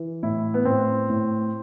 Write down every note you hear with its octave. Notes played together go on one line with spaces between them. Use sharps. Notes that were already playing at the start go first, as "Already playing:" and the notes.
Already playing: E3
A2 E4
B3
A2 C4
A2